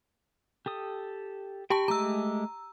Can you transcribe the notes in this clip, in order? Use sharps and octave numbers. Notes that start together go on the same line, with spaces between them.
G4 A4 D#6
G4 G5 A5 B5 C#6
G#3 A3 G4 A#5 E6